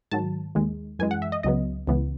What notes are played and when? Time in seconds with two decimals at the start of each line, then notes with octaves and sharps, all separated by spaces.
0.11 G#2 D#3 F#3 A5
0.55 D#2 D#3 G#3
0.99 F#2 E3 G#3 G#5
1.11 F#5
1.22 E5
1.32 D#5
1.43 C#2 C#3 F#3 B3 D#5
1.87 C#2 C#3 E3 B3